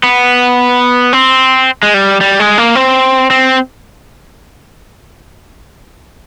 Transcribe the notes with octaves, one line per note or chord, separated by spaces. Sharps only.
B3
C4
G#3
G3
G3
G#3
A#3
C4
C4